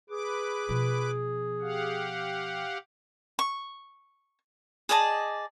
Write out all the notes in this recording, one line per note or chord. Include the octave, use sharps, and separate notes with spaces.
G#4 B4 D6
B2 F3
G4 F5 F#5
C#6
G#4 D5 D#5 A5